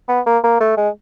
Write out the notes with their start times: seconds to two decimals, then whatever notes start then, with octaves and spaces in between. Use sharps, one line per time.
0.09 B3
0.26 A#3
0.44 A#3
0.60 A3
0.77 G#3